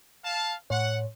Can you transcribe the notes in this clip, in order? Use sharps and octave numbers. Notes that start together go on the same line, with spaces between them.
F5 A5
A2 C#5 F#5